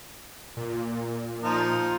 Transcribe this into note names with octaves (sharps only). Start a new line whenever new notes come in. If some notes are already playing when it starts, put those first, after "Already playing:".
A#2
F3 D#4 F4